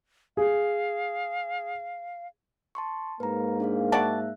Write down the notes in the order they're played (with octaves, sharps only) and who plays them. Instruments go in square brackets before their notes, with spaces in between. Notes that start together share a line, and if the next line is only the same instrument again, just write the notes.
[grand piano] G#4 [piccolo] F5
[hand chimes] A5 C6 C#6
[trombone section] G#2 A#3 [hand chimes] B4 A#5
[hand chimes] D4 G#4 F5
[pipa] F#4 D5 A5 [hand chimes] E5 F#6